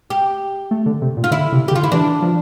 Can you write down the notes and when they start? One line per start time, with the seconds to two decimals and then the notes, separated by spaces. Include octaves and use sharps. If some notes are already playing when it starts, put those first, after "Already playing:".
0.10 G4
0.71 A3
0.86 D3
1.02 C3
1.17 A#2
1.24 F4
1.31 D3 E4
1.52 C3
1.68 G4
1.71 D3
1.76 F4
1.83 E4
1.92 E3 D4
2.22 F3